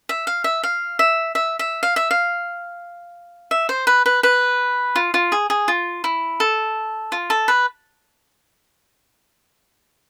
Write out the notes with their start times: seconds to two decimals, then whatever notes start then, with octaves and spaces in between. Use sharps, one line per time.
0.09 E5
0.27 F5
0.44 E5
0.64 F5
0.99 E5
1.35 E5
1.59 E5
1.83 F5
1.96 E5
2.11 F5
3.51 E5
3.69 C5
3.87 B4
4.06 B4
4.23 B4
4.96 F4
5.14 F4
5.32 G#4
5.50 G#4
5.68 F4
6.04 E4
6.40 A4
7.12 F4
7.30 A4
7.48 B4